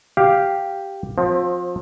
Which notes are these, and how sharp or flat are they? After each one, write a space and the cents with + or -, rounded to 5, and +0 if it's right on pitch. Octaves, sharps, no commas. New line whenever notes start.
G4 +0 F5 +0
F3 +30 C4 +15